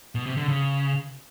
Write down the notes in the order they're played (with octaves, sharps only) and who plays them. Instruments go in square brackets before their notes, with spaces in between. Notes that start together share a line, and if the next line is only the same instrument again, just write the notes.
[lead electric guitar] B2
C3
D3
C#3